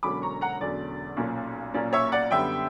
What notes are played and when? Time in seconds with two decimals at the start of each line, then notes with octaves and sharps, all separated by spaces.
0.03 E1 E2 D3 F#3 C#4 B5 D6
0.22 A#5 C#6
0.41 F#5 A#5
0.61 E1 E2 D3 F#3 C#4 D5
1.17 B1 A#2 A#3 C#4
1.74 B1 A#2 A#3 C#4 D5
1.93 C#5 E5
2.12 D5 F#5
2.31 F#2 D3 G3 B3 E5 G5